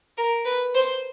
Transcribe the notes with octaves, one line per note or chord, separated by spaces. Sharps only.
A#4
B4
C5